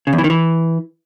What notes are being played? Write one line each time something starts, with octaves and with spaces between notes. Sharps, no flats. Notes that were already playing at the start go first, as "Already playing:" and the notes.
C#3
E2
E3
D#3
E3